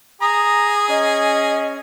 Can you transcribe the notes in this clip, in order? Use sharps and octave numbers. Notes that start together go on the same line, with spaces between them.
G#4 A#5 D#6
C#4 D#5